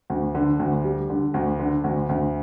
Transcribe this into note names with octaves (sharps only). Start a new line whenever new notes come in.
D2
D3
D2
G3
D3
D2
D3
D2
D2